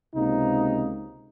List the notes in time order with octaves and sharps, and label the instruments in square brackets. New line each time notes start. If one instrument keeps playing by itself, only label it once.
[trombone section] C#2 C3 A#3 D#4